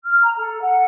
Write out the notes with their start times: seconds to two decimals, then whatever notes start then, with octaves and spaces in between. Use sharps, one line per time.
0.04 F6
0.22 A#5
0.37 A4
0.61 F#5